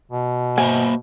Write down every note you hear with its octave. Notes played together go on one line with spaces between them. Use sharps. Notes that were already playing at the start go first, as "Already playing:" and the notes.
B2
A#3 C5 E5 G#5